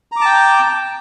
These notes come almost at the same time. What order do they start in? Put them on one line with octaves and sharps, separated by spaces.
A#5 D6 A5 G5